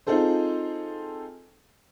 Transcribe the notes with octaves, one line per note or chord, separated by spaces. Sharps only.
C4 D#4 F4 G#4 A4 C5